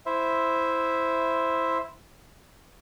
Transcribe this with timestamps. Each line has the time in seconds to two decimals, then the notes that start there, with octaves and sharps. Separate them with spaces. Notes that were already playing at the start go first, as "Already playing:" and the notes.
0.06 E4 C5 E5